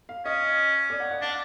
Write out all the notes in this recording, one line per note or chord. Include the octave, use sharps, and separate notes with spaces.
F5
C#4 D#5
D5
F#5
F#5
D4 F#5